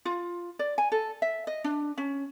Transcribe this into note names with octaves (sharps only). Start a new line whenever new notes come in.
F4
D5
G#5
A4
E5
D#5
D4
C#4